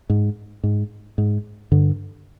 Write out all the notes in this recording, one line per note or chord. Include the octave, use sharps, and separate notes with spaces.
G#2
G#2
G#2
G2 D3